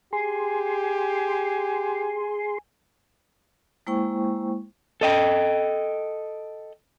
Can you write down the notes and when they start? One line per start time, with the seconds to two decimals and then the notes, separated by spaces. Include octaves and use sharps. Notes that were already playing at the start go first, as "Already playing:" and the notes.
0.13 G4 G#4 G#5 C6
3.87 G#3 A#3 E4 C5 G5 C#6
5.01 A4 D#5 G5